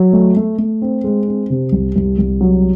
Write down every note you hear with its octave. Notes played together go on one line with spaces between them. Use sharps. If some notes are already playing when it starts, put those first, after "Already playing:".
Already playing: F#3
A3
A3
A3
C4
G#3
C4
C3
C2
C2
C2
F#3